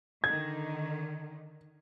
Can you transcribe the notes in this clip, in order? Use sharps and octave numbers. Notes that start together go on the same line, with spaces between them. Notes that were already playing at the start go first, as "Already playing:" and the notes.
D3 D#3 G#6